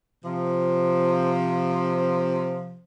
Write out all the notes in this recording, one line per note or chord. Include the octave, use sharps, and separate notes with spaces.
C3 F3